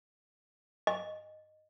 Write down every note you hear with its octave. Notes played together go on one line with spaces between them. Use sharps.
D#5